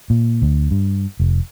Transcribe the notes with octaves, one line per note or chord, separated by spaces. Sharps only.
A#2
D2
G2
F1